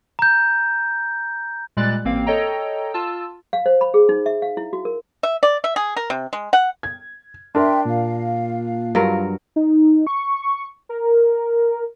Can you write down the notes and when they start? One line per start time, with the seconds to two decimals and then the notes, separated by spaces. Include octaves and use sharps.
0.19 A#5 G6
1.77 A#2 G3 G#3 D5 F#6 A6
2.05 A1 A#3 C4 F5
2.26 A4 C#5 D#5 G5 A#5
2.94 F4 A5 E6
3.53 F5
3.66 C5
3.81 B5
3.94 G#4
4.09 D#4
4.26 E5
4.42 F5
4.57 E4
4.73 F#4
4.85 A#4
5.23 E5
5.43 D5
5.64 E5
5.76 G#4
5.97 A#4
6.10 C3
6.33 G#3
6.53 F#5
6.83 G#6
7.55 D4 A#4 E5 G5 C6
7.85 A#2 F5
8.95 G2 F#3 F4 A#4
9.56 D#4
10.07 C#6
10.89 A#4